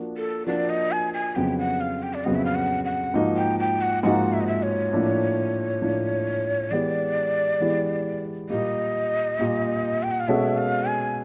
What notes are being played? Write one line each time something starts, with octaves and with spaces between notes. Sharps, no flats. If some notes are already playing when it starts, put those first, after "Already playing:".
Already playing: F3 A#3 D4 F#4 A#4
A4
F3 A#3 D4 F#4 A#4 D5
D#5
G#5
G#5
F2 C#3 F#3 B3 G5
F#5
F5
G5
D5
F2 C#3 F#3 B3 D#5
E5
F5
F#5
F#5
G#2 F3 A#3 D#4 F#4
G5
G5
F#5
G#2 F3 A#3 D#4 F#4 F#5
E5
D#5
E5
C#5
A2 F3 A#3 D4 F4
A2 F3 A#3 D4 F4
E3 G#3 B3 E4 G4 D5
E3 G#3 B3 E4 G4
A#2 G3 A#3 D#5
A#2 G3 A#3
G5
F#5
F5
B2 G#3 C#4 F#4 A4 E5
F5
G#5